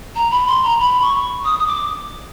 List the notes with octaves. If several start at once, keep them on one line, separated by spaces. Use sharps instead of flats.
A#5
B5
C6
A#5
B5
C#6
D#6
D#6
D6